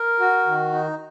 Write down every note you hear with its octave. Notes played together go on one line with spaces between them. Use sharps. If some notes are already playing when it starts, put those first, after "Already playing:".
Already playing: A#4
F#4
D#3
D#4